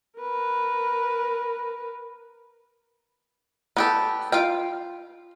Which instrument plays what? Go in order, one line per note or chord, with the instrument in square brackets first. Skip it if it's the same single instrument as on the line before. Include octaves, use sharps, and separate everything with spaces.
[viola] A#4 B4
[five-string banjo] B3 G4 A4
F4 F5 G5